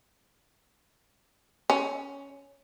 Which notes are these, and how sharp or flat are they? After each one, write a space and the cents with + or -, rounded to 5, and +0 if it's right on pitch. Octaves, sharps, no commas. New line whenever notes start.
C#4 +10